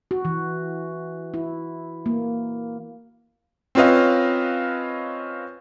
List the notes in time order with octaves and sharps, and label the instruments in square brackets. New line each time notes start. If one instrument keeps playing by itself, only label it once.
[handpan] F#4
E3
E4
A#3
[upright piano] C4 C#4 F4 B4 D#5 F5